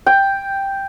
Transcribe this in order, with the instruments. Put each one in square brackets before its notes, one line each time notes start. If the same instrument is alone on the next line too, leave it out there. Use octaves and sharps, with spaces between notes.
[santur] G5